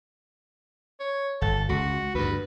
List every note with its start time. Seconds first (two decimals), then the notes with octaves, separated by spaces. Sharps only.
1.00 C#5
1.42 G1 A4
1.69 C#2 F#4
2.15 D2 G2 B4